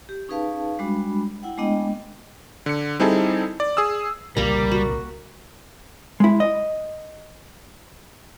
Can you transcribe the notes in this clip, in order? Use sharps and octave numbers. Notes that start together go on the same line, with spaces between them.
G4
C#4 D#4 G#4 B4 F5 A5
G3 G#3 D4 F#4 B5
E4 F#5 G5
G#3 A3 B3 D4 D#5 G5
D3 C#7
G3 C4 D#4 E4 G#4 A4
D5
G#4 D#6 E6
C2 A#2 C#3 G3 A#3 A#4 A#5
F#4
G#3 E4
D#5